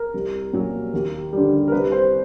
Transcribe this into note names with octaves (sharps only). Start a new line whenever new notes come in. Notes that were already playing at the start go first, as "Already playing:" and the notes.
Already playing: A#4
C2
A#2 F#3
D#2
D3 G3
A#4
C2 B4
C5